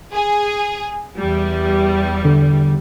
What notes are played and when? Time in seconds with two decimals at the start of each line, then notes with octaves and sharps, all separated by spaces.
0.12 G#4
1.19 E2 G3
2.25 D3